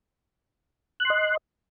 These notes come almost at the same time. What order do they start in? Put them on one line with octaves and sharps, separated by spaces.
F#6 C6 D#5